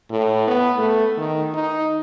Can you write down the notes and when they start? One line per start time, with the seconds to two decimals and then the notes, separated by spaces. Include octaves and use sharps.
0.11 A2
0.48 B3
0.78 A3
1.18 D#3
1.54 D#4